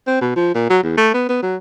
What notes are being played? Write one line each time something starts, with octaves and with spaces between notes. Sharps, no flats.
C4
B2
F3
A#2
F#3
E2
A3
B3
B3
F#3